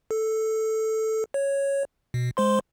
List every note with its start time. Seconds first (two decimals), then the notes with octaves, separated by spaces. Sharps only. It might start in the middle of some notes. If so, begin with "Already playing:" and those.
0.11 A4
1.34 C#5
2.14 B2
2.37 G#3 C5 C6